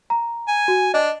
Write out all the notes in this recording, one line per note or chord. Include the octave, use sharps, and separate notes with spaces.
A#5
G#5
F#4
D4 D#5